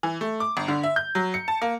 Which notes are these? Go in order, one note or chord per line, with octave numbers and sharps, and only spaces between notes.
E3
A3
D6
G1
D3
E5
G6
F#3
C#7
A5
A#3